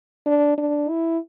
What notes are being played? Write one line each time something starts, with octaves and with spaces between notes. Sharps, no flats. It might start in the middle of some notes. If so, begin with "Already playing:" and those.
D4
D4
E4